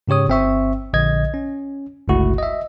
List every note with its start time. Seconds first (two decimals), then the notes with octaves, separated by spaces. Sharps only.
0.08 G#2 C#3 G4 C#5 D#6
0.28 G1 C4 E5 C#6
0.93 A#1 D3 D#5 G#6
1.34 C#4
2.08 G1 C#2 A3 E4 F#4
2.38 D#5 E5